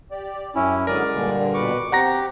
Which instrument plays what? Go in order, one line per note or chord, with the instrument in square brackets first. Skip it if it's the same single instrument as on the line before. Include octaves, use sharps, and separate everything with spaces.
[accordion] G4 D5
[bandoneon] F#2 C#4 E4 [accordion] G4
[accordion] D3 F#3 D#6 [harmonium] G#3 [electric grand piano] A#4 [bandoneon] D5
[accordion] G2 A#2 D3
[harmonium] B2 B4 [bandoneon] C#6 D6
[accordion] C4 [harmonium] G4 [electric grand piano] F#5 A#5 A#6